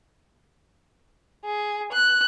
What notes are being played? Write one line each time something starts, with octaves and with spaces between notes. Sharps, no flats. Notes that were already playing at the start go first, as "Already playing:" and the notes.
G#4
F#6